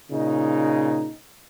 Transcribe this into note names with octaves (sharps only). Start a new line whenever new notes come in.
A#2 C#3 D#4